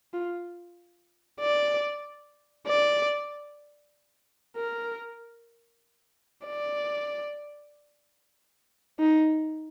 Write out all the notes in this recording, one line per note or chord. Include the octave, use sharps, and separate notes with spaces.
F4
D5
D5
A#4
D5
D#4